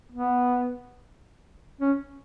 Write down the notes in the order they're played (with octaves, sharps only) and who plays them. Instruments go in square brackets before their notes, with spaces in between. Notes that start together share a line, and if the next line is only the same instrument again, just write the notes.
[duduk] B3
C#4